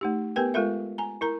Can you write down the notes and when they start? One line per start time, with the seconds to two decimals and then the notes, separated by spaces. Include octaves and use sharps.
0.01 A3 D#4 G4
0.36 B3 G4 A#4 B4 G5
0.54 G#3 F4 A4 A#4 E5
0.98 G#5 A#5
1.21 E4 A#4 A#5